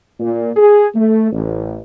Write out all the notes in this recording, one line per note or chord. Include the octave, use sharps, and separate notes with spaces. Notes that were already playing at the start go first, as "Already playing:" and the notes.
A#2
G#4
A3
A1